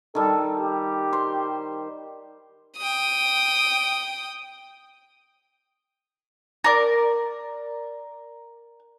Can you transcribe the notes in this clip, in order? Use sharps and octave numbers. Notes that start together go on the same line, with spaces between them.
D#3 G3 A4
G4
C5
G5 D#6
A#4 D5